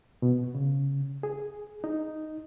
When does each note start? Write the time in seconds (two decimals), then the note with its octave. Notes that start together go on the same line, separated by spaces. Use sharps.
0.22 B2
0.55 C#3
1.23 G#4
1.84 D#4